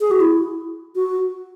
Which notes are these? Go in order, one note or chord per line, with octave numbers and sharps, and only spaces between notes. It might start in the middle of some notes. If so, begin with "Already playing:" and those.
G#4
F#4
E4
F#4